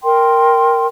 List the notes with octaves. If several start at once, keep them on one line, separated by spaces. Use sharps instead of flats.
A#4 G5 C6